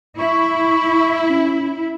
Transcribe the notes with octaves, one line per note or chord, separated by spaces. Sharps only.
E4 C#6
C#4